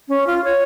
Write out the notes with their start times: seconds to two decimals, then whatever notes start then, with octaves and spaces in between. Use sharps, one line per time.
0.09 C#4
0.27 F4
0.44 C#5